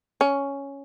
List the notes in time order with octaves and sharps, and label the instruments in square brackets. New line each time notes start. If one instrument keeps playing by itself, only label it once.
[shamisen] C#4